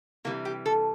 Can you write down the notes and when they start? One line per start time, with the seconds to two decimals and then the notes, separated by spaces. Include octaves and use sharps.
0.25 C3 E3 G3 A#3
0.45 G4
0.66 A4